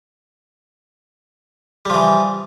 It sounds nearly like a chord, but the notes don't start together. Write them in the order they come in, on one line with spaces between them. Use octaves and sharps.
G3 F3 E3